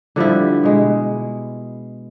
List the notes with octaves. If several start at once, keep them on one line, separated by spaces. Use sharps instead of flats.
D3 F3 G3 E4
B2 G#3